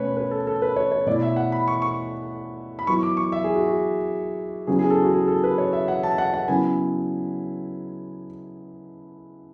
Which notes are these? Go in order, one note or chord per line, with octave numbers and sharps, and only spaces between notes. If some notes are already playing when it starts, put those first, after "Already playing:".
Already playing: B2 A3 C#4 B4 C#5
B4
A4
A4
B4
C#5
C#5
B2 A3 E4 D5
E5
F#5
B5
C#6
C#6
B5
F#3 B3 E4 C#6
D6
C#6
E5
G#4
F#4
F#4
C#3 F#3 B3 E4 G#4
G#4
A4
F#4
G#4
A4
B4
C#5
E5
F#5
A5
F#5
F#5
C#3 F#3 B3 E4 G#5